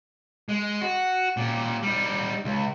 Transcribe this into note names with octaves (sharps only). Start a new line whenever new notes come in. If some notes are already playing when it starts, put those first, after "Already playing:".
G#3
F#4
A#2 G4
G3 D#4
C#2